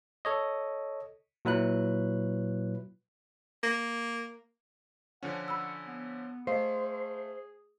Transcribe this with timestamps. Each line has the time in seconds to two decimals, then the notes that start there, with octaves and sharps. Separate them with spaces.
0.25 A4 C#5 D#5
1.45 A#2 F#3 E4 B4 F#6
3.63 A#3
5.23 D3 F3 C#4 F#5
5.48 B5 E6
5.87 B3
6.47 A3 G#4 C5 D#5 F5